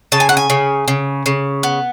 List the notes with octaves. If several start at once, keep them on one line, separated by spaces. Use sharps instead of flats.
C#3 A5
G#5
F#5
G#5
C#3
C#3
C#3
B3